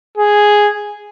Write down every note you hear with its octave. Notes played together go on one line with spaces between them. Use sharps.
G#4